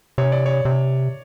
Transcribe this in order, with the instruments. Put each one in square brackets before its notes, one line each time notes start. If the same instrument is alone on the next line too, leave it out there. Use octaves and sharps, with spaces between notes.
[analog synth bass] C3 [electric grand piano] C#5
[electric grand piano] D5
C#5
[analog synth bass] C3